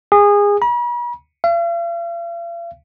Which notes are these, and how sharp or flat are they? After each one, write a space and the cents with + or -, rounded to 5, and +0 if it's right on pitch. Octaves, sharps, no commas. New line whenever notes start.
G#4 -25
B5 -45
F5 -45